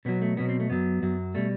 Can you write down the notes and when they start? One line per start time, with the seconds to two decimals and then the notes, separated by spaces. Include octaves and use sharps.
0.05 B2 F#3 B3
0.22 A3
0.37 B2 F#3 B3
0.49 C4
0.60 A3
0.70 F#2 F#3 B3
1.02 F#2 F#3
1.35 B2 G3 A3